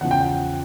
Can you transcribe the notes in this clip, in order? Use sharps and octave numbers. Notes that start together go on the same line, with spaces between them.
E2 C#3 F3 F#5
G5
F#5